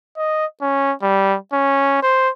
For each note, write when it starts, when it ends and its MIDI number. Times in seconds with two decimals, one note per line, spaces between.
0.17 0.46 75
0.61 0.93 61
1.02 1.36 55
1.53 2.02 61
2.02 2.30 72